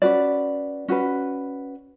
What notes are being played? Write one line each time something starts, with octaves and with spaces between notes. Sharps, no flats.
C#4 F#4 B4 D5
C#4 F#4 B4